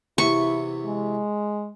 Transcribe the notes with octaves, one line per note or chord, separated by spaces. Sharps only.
E2 C3 E4 B4 C#6
G#3